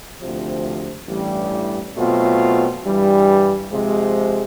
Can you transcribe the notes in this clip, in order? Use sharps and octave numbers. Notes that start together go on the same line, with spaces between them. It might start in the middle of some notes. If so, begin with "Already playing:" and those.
D2 C3 F3
A1 G2 E3 G3
B2 F#3 A3 C4 F4
G2 E3 G3
C3 F3 G#3